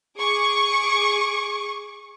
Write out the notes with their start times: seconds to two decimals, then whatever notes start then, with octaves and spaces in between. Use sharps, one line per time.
0.19 G#4 C#6 D6